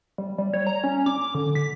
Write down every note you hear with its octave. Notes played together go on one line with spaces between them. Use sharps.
G3
G3
C#5
A#5
C#4
D6
D3
B6